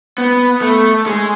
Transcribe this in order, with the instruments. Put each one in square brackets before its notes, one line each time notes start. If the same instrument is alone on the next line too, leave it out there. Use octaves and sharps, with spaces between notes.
[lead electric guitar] B3
A3
G#3